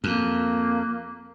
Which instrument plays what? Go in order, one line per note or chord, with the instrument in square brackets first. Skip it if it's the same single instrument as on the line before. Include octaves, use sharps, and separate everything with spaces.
[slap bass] F2 [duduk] A#3